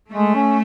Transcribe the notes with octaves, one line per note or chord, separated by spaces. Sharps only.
G#3 A3
C#4